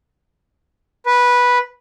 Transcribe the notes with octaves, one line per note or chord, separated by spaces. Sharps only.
B4